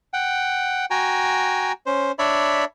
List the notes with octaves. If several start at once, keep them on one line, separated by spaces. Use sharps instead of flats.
F#5 G5
F#4 G5 G#5 A#5
C#4 C5
D4 C#5 D5 E5 B5